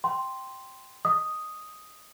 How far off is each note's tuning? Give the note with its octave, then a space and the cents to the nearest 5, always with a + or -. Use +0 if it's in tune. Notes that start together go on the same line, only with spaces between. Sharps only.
G5 +0 C6 +0
D#5 +0 D#6 +0